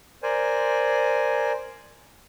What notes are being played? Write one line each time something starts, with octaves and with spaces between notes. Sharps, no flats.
A#4 C5 D5 G#5